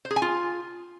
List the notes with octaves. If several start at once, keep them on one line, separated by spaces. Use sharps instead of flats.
C5
G#4
G#5
F4